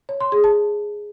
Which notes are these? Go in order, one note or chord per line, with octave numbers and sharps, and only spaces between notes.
C#5
C6
G#4
A5